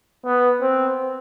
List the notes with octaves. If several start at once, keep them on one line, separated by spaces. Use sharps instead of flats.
B3
C4